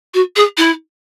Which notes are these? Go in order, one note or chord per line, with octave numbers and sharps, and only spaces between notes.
F#4
G#4
E4